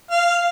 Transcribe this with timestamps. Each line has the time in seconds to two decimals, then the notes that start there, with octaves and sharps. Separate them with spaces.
0.11 F5